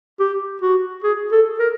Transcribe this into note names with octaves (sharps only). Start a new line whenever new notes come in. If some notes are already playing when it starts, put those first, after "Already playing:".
G4
F#4
G#4
A4
A#4